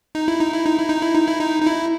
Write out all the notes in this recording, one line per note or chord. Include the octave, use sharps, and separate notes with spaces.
D#4
E4
D#4
E4
D#4
E4
D#4
E4
D#4
E4
D#4
D#4
E4